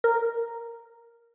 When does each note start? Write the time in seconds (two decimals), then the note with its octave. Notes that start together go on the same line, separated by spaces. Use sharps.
0.04 A#4